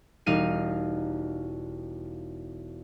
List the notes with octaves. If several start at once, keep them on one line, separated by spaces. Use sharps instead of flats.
E1 G3 D#4 F5 D#7